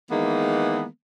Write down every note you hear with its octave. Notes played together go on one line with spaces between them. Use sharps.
D#3 E3 G#3 A#3 B3